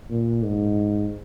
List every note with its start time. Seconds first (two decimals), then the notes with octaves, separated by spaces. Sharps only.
0.10 A#2
0.44 G#2